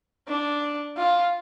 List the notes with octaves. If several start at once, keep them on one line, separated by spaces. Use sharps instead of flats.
D4
F4